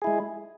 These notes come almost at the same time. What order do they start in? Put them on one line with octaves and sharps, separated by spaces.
G#4 E4 G#3